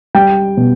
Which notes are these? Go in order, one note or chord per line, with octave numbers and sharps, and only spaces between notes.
G3 G5
B2